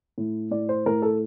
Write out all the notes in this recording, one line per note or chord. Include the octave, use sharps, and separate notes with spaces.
A2
A2 D5
C5
A2 A#4
A4